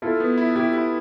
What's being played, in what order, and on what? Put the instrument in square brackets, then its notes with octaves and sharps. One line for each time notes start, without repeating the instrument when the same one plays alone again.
[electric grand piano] E4 [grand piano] F4 A4
[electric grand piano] B3
E4
[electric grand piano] E4 [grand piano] G4
[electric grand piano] E4